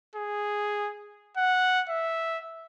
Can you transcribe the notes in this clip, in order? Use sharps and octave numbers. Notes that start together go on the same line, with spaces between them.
G#4
F#5
E5